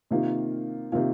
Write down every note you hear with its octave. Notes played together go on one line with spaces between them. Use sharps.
C3 D#3 A#3 F4
C3 D#3 A#3 F4